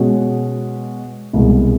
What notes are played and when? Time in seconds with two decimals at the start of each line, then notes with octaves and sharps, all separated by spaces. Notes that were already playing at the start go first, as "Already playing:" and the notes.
Already playing: B2 G#3 C#4 F#4
1.33 C2 B2 G#3